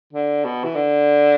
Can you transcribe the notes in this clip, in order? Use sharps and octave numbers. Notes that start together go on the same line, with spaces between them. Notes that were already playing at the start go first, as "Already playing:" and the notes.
D3
B2
E3
D3